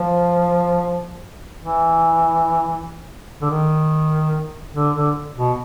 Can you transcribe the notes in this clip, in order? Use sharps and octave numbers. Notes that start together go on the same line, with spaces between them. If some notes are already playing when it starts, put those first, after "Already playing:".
Already playing: F3
E3
D3
D#3
D3
D3
B2